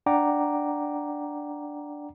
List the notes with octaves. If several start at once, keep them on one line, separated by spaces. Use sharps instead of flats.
D4 D5 F#5 G5 A#5 D6